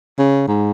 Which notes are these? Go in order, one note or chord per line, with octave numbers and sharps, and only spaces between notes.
C#3
G#2